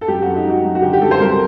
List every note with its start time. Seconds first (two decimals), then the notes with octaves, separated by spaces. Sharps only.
0.01 A4
0.08 F#2 G4
0.22 F#2 F#4
0.35 D#4
0.45 F#3 F#4
0.64 F#2
0.75 F#4
0.82 D3 G4
0.93 G4
1.01 F#2 A4
1.11 C5
1.20 C2 A#4